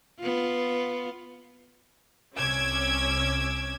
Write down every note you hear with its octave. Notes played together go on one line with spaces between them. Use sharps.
B3 F4
C2 C#4 D6 E6 G#6